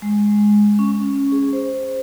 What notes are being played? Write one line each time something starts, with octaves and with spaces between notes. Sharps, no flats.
G#3
C#4
G#4
C5